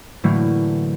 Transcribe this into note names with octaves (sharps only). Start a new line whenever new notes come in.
A2 D3 E3 F#3 A3 A#3